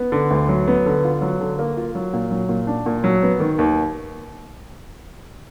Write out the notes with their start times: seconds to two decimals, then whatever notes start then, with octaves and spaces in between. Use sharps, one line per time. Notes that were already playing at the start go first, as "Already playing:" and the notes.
Already playing: B3
0.12 D3
0.31 D2
0.49 F#3
0.68 B3
0.86 D3
1.04 F4
1.22 F#3
1.40 D3
1.59 A#3
1.77 F4
1.95 F#3
2.14 A#2
2.31 F#3
2.49 A#2
2.67 D4
2.86 A#2
3.04 F#3
3.23 B3
3.40 D#3
3.58 D#2